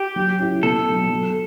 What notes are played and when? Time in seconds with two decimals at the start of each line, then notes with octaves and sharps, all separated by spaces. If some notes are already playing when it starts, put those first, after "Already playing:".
Already playing: G4
0.16 F#3
0.39 C#4 E4
0.63 B2 A4
0.86 F#3 A3
1.10 F#3